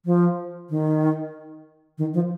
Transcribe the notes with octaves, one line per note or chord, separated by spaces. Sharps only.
F3
D#3
D#3
F3